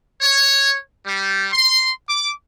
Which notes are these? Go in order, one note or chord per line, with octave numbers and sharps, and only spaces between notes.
C#5
G3
C6
D6